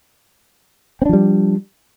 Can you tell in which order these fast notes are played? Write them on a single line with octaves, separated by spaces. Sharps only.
C4 D4 F3 G3